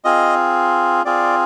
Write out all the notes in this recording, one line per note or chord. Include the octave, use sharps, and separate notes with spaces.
C4 F4 G#4 D#5
C4 F4 G#4 D5